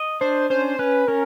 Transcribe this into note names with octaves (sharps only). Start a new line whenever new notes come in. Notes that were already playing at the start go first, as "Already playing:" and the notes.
Already playing: D#5
D4 C5
C#4 C5
C#4 B4
C#4 A#4